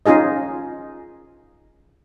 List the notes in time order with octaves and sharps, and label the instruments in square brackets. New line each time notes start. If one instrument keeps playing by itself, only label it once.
[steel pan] C#4 D#4 F4 G#4 D#5